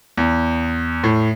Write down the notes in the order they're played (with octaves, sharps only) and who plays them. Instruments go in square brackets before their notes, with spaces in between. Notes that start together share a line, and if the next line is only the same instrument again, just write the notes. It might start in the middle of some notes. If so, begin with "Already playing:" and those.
[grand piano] E2
A2